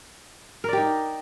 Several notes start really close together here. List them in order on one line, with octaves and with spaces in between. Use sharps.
A#4 D5 G4 D#4